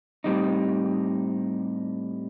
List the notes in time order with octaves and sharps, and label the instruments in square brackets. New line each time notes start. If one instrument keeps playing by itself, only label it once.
[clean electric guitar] A2 G3 C4 D#4